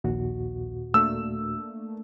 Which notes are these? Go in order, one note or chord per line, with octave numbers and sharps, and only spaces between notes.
A#1 D#2 A#2 F#4
A3 A#3 D4 E6